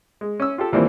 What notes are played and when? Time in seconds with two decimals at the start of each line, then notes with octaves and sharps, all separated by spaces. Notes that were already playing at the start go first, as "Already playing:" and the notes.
0.21 G#3
0.40 C#4 E6
0.58 F4 G4 A4
0.72 D#2 E3 F3 G3 A#3 C4